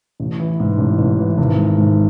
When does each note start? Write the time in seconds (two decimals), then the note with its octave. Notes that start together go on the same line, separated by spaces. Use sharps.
0.20 A1
0.40 E3
0.60 G#2
0.78 A1
0.99 A1
1.19 E3
1.38 G#1
1.58 G#3
1.78 G#2